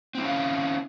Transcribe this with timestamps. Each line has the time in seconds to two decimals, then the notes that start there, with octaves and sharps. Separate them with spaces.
0.15 C4
0.18 E4
0.22 C#4
0.26 F5